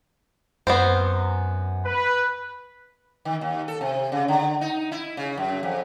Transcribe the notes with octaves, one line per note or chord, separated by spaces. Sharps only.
F#2 B3 C4 C5
B4
D#3
D#2
A4
C3
C#3
D3
D#4
E4
C#3
F#2
F2